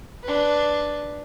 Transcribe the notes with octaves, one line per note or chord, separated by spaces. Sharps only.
D4 B4